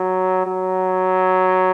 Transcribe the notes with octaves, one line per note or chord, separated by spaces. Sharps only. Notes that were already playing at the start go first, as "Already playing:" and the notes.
Already playing: F#3
F#3